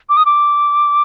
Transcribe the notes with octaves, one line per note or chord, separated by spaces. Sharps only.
D6
D#6
D6